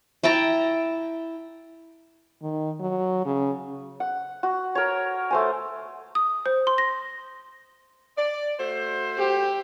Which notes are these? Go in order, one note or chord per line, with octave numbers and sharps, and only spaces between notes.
E4 G5 A5 A#5
D#3
F#3
C#3
F#5
F#4
A#4 C#5
A3 C5 G#5
D#6
C5
C6
A#6
D5
A3 F#4 C5
G4